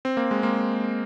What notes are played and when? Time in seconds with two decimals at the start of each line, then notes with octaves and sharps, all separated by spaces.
0.05 C4
0.17 A#3
0.31 G#3
0.43 A#3